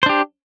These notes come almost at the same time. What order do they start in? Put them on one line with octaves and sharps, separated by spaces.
C5 D4 G4